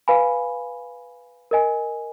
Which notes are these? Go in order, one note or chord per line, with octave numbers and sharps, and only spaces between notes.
B4 F5 G#5 B5
A#4 D#5 G#5